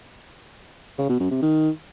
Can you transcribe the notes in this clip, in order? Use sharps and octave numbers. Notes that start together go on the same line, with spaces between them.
C#3
B2
F#2
C3
D#3